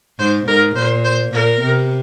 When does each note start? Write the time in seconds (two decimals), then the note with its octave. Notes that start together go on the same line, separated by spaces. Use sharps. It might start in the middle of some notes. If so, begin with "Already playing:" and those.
0.19 G#2 C5
0.47 G#2 A#4
0.76 A#2 C5
1.04 C5
1.33 A#2 A#4
1.61 C3